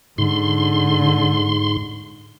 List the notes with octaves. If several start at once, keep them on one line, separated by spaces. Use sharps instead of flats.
G#2 D3 C6